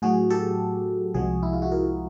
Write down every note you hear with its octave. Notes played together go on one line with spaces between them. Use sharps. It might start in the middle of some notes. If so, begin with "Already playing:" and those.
A2 F#3 F#4 G#4
G4 A4
C2 C3 F3 G#3 F#4 G#4
E4
F4
E4 F#4
G#4 A#4